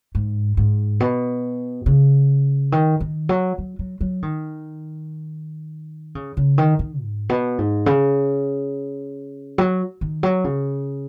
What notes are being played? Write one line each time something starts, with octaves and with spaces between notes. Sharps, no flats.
G#2
G#2
B2
C#3
D#3
D#3
F#3
F#3
F#3
F#3
D#3
C#3
C#3
D#3
D#3
G#2
B2
G#2
C#3
F#3
D#3
F#3
C#3